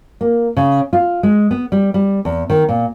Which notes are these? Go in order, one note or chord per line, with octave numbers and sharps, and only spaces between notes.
A#3
C#3
F4
G#3
B3
G3
G3
E2
D#3
A#2